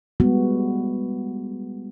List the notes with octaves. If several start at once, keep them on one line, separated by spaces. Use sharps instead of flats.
G3 G#3 B3 F#4